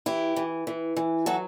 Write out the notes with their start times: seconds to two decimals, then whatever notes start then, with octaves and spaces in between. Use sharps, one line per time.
0.06 E3 E4 G4
0.36 E3
0.67 E3
0.97 E3
1.26 F#3 F#4 A4